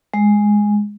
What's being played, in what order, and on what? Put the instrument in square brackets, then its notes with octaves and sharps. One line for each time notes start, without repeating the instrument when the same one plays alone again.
[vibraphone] G#3